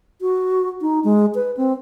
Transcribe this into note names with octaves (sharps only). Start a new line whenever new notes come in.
F#4
D#4
G#3
B4
C4